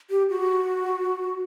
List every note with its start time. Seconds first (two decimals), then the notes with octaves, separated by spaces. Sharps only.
0.10 G4
0.30 F#4